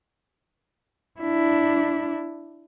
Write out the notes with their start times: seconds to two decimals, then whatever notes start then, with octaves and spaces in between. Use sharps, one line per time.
1.21 D4 E4